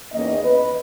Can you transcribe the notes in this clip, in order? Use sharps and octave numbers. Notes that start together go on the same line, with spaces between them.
E2 D#3 A#3 C#4 D#5
B4